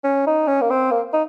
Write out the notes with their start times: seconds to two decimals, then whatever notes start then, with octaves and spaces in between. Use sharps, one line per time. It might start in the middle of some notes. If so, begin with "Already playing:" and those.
0.04 C#4
0.27 D#4
0.48 C#4
0.61 A#3
0.70 C4
0.91 A#3
1.13 D#4